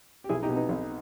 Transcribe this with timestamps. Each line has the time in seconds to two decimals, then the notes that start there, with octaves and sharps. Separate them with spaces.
0.24 G4
0.29 B1 E4 G#4
0.43 D#4 G4
0.49 B2
0.56 B3 D#4
0.69 B1